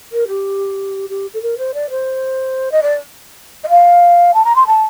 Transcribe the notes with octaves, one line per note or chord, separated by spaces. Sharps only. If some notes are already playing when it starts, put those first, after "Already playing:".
A#4
G4
G4
A4
A#4
C5
D5
C5
D#5
D5
D#5
F5
A5
A#5
C6
A5